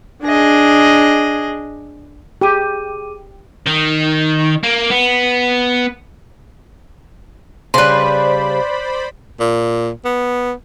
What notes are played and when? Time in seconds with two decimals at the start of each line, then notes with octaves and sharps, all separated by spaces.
0.23 D4 G#4 D#5
2.41 G4 G#4 D6 D#7
3.67 D#3
4.63 A#3
4.90 B3
7.74 C#3 G3 B4 C5 D5 B5 C6
9.40 A#2
10.05 B3